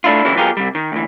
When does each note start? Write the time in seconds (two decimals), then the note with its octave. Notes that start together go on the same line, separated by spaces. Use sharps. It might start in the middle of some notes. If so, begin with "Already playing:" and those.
0.04 A3 D4 E4 F4
0.25 A#2 C#3 E3 F#3 A#3 E4
0.37 F#3 B3 F4 G4 G#4 A#4
0.57 C3 G3
0.75 D#3
0.92 D2 E3